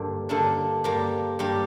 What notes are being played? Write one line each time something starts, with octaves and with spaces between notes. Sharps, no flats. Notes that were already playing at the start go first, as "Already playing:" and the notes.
Already playing: G2 D3 A#3 D4
G2 D3 A#3 D4
G2 G3 A#3 G4
G2 G3 A#3 G4